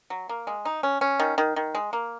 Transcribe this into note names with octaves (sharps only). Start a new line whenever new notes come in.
F#3
A#3
G#3
D#4
C#4
C#4
D#3
D#3
D#3
G#3
A#3